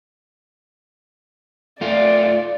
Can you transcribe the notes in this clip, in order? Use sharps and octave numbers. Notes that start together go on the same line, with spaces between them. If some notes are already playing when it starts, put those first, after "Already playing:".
A3 F4 D5